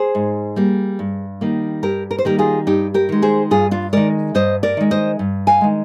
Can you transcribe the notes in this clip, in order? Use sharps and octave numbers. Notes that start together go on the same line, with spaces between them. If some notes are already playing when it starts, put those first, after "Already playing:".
Already playing: G#4 C5
G#2
G3 A#3
G2
D#3 G3 A#3
G2 G4 A#4
A#4
C5
D#3 G3 A#3 G4 A#4
F4 G#4
G2 D#4 G4
G4 A#4
D#3 G#3
G#4 C5
G2 F4 G#4
D4 F4
D#3 G#3 A#4 D5
G2 C5 D#5
A#4 D5
D#3 G#3
C5 D#5
G2
F5 G#5
D#3 G#3